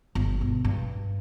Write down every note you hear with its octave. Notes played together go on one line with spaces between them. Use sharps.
G1
B1
G2